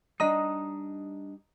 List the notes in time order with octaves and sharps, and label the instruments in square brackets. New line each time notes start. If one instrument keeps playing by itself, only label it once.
[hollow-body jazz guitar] G3 D4 D#4 [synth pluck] D#5 A#5 D#6